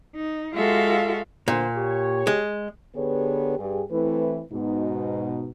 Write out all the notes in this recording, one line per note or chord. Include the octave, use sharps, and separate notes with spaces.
D#4
G#3 F4 F#4 A4 E5 F5
A#2 D3 C5
G4 C#5
G#3
D3 B3 G4 G#4 B4 C#5
G2 G4 G#4
E3 A3 C4 E4 B4
G#2 B2 D#4